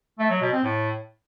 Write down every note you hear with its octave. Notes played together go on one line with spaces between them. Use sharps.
A3
F#3
B2
C4
A2